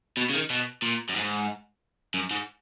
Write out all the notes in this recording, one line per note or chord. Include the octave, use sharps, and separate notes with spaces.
B2
C#3
D#3
B2
A#2
F#2
G#2
F#2
G#2